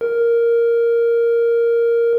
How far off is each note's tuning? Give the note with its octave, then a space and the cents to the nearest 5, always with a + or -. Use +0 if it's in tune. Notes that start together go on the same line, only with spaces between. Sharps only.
A#4 +0